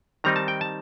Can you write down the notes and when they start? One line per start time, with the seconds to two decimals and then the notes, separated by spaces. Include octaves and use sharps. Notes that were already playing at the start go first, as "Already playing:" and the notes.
0.24 D#3 G3 C4 D#4 A#5
0.36 A5
0.48 G5
0.61 A5